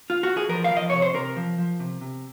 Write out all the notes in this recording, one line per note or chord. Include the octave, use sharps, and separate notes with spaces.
F4
F#4
G#4
F3 A#4
F5
F3
D#5
C3 C#5
C5
C3 A#4
F3
F3
C3
C3